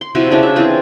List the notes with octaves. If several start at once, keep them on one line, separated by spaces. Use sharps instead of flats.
C6
C3 F3 E4 F#4
C#3 D4 E4
E5
E3 C4 F4 G#4